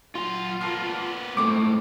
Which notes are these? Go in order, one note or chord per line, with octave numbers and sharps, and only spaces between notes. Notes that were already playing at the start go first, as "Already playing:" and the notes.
F#3 F4 C6
A#3 B3 A4 A#4
G#2 A3 C4 D6